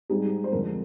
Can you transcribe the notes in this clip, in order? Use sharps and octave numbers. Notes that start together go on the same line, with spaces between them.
G#2 G3 C4 D#4 G#4
C5
F2 D3 G#3 A#4